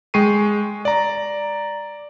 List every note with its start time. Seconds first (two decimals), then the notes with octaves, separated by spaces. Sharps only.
0.14 G#3 G5 C#6 C7 D#7
0.85 D5 A#5